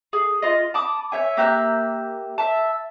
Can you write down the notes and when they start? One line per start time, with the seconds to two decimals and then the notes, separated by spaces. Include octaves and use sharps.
0.13 G#4
0.42 F4 D#5
0.74 A5 B5 D6 D#6
1.12 C#5 E5 G#5
1.37 A#3 G4 E5 F#6
2.38 E5 A5